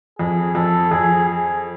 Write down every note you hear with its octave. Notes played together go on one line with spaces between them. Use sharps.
F2 G#4
F2 A4
F2 G#4
G#4